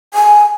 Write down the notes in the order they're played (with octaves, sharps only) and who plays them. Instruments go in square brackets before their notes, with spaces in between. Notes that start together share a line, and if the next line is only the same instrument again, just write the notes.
[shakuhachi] G#5